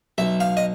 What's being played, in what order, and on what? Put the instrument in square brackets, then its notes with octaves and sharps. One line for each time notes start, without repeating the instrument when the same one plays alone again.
[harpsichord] B1 E5
F5
D#5